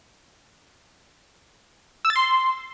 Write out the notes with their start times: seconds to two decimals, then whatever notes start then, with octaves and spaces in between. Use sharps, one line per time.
2.05 E6
2.10 A6
2.16 C6